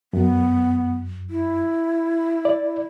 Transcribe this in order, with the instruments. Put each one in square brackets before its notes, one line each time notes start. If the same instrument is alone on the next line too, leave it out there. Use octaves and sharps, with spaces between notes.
[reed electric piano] F#2 [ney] B3
[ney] E4
[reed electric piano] D5